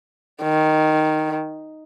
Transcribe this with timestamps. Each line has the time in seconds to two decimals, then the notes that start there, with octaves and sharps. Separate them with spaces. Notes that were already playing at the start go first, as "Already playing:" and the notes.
0.43 D#3